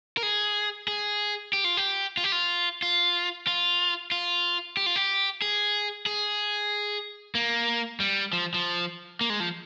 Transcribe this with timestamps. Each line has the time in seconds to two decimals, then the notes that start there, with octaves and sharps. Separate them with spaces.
0.17 A#4
0.23 G#4
0.88 G#4
1.53 G4
1.64 F4
1.77 G4
2.17 F4
2.24 G4
2.32 F4
2.82 F4
3.47 F4
4.11 F4
4.77 G4
4.86 F4
4.96 G4
5.42 G#4
6.06 G#4
7.35 A#3
8.00 G3
8.33 F3
8.54 F3
9.21 A#3
9.30 G#3
9.40 F3